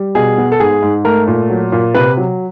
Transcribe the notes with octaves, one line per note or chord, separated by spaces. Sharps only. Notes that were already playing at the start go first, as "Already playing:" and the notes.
Already playing: G3
B2 G#4
B3
A4
G#2 G#4
G#2
A3 A#4
A#2
F#3
A#2
C3 B4
F#3